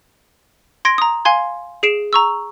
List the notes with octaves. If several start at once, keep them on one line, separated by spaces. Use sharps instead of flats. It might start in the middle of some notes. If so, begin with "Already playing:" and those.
C6 G#6 A#6 D7
A#5 D#6
F5 G#5 C6 G#6
G#4 C7 D7 E7
A#5 C#6 E6